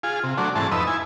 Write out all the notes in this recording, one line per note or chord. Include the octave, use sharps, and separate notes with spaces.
F4 G#4
C3
F#3 A3 D4
G#2 E3 A3 C4 A5
F2 D#4 B4 E6
E4 G#5